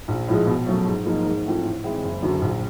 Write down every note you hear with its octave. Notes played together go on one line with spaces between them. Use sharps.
A#1
A2 F3 G#3
B2
F#3 A3 C#4
G#2
F3 A#3 D#4 G#4
G#2
E3 A3 C4 F4
A2
E3 G#3 C4 E4
F#1
F#2 D3 F#3
A#1